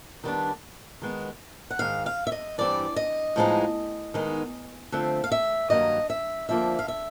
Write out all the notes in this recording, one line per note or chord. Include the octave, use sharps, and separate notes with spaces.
D#3 G3 B3 D4
D#3 G#3 B3
F#5
G#2 D#3 G#3 F5
F5
E5
D#5
G2 E3 G3 C4 D5
D#5
A2 F3 G#3 B3 D#4
D#3 G#3 B3 D#4
D3 F3 A3 C4 E5
F5
E5
G2 D#3 F#3 A#3 D#5
E5
F2 D3 F3 A#3 E5
F5
E5